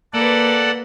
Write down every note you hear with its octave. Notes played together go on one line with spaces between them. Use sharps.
A#3 A4 B4 D5 F#5